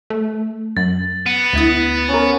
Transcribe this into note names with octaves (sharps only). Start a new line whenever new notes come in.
A3
F#2 A6
B3
D2 E4 D#6
C#4 A#4